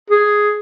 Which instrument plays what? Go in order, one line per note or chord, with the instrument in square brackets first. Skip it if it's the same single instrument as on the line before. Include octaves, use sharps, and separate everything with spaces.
[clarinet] G#4